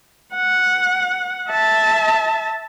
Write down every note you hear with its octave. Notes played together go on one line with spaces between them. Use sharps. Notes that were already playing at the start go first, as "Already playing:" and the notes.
F#5
E5 A5